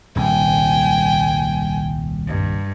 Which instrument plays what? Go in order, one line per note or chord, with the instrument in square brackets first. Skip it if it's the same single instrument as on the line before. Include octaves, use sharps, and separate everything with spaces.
[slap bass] D#1 C2 [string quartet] G5 G#5
[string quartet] G2